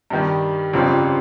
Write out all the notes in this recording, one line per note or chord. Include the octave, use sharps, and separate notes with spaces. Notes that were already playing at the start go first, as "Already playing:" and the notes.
G2 D#3 G3
G1 F2 C#3 G3 C4